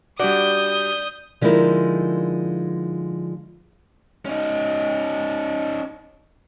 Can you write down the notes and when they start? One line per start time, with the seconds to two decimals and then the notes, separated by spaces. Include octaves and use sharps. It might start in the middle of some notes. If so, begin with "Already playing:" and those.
0.19 G3 D4 F#4 D5 D#6 G6
1.41 D3 F3 G#3 D#4 E4 A#4
4.25 C#4 D#4